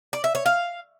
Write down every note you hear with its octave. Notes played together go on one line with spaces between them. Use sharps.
D5
E5
C#5
F5